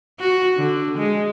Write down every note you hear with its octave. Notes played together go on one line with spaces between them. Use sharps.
F#4
D3
G#3